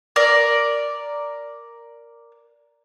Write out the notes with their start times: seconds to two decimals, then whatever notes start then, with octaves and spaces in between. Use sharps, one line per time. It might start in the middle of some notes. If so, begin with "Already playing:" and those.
0.16 A#4 D5